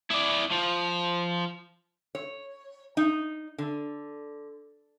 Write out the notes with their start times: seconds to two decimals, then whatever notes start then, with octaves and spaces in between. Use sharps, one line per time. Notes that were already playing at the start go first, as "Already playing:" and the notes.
0.10 E4 D5
0.51 F3
2.15 C#5
2.97 D#4
3.58 D3